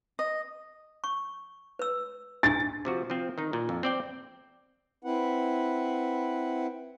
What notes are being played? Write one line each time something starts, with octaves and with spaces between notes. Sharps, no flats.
D#5
C#6
B4 E6
D4 G#4 G#5 A6
C3 F3 F#4
F3 C4
D#3 D#4
A#2
F2
C4 D5 G5
C4 E4 B4 F#5